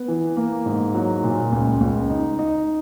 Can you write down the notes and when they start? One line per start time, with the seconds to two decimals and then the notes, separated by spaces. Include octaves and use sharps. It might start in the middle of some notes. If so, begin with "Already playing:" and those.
Already playing: B3
0.08 E3
0.37 A#3
0.66 G#2
0.94 F#3
1.23 A#2
1.52 C#2
1.81 C#2
2.10 D#4
2.39 D#4